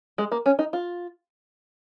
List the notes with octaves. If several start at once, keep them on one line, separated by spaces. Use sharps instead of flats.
G#3
A#3
C#4
D#4
F4